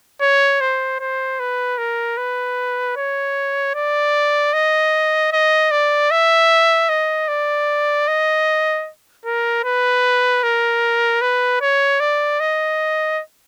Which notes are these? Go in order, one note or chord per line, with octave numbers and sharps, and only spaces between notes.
C#5
C5
C5
B4
A#4
B4
C#5
D5
D#5
D#5
D5
E5
D#5
D5
D#5
A#4
B4
A#4
B4
C#5
D5
D#5